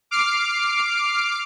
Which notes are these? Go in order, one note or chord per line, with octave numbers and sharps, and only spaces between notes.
D6 F6 C7 D7